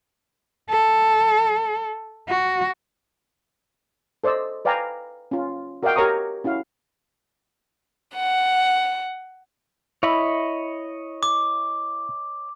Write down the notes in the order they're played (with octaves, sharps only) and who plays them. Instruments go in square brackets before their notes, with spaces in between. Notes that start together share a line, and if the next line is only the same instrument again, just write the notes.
[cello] A4
F#4
[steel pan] A4 C5 D5 D#5 E6
B4 D5 F5 G5 G#5 A#5
C#4 F4
F#4 A#4 D5 D#5 F5 G5
G4 A#4 C#5 A#5 C#6 D#6
C#4 E4 F#4 F5
[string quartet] F#5
[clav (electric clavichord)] E4 [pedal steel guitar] C#5 D#5 B5
[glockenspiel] D6